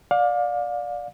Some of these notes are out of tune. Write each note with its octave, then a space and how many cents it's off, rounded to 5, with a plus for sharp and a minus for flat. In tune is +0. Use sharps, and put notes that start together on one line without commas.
D5 +0 F5 +30